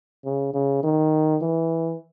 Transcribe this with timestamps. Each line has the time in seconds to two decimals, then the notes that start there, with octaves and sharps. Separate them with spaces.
0.25 C#3
0.54 C#3
0.84 D#3
1.42 E3